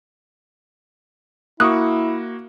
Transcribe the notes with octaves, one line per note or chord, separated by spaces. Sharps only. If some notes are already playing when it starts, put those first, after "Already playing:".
A#3 E4 F#4 C#6 D#6 F#6